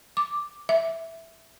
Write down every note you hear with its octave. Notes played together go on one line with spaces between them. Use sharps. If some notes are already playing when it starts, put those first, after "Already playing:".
D6
E5